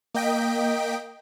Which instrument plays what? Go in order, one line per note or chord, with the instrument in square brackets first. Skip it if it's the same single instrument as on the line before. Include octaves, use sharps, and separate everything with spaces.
[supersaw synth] A#3 D#5 G5 B6 D7